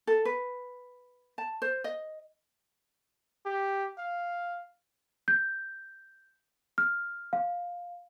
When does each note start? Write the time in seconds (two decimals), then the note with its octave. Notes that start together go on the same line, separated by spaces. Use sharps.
0.07 A4
0.25 B4
1.38 A5
1.62 C5
1.84 D#5
3.46 G4
3.98 F5
5.28 G6
6.78 F6
7.33 F5